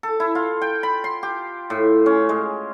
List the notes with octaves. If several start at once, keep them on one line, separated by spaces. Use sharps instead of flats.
A4
E4
F4
G5
B5
C6
G4
A2
C#4
G#3